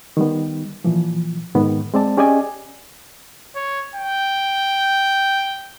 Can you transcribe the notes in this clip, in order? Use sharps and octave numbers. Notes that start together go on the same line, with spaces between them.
D#3 G3 B3
A#2 E3 F3
G#2 D#3 B3
G#3 C4 D5 A5
C#4 G4 G#4 D5 D#5 G#5
C#5
G5